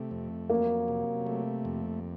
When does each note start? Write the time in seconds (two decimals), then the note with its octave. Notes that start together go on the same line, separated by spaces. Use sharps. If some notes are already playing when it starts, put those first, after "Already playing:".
Already playing: C3 A3
0.11 F2
0.50 F#3 A#3
0.88 C3
1.27 A3
1.65 F2